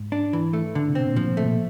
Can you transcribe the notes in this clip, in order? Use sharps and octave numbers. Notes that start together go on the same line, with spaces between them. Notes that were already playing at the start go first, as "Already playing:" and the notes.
Already playing: G#2
D4
E3
A3
D3
C3
B2 C4
A#2
A2 F3
A3
A#2